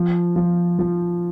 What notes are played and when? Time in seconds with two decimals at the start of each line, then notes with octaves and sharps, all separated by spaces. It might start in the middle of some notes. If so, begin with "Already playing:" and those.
Already playing: F3
0.36 F3
0.79 F3